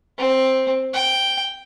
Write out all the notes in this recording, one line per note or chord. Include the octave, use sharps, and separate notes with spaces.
C4
G5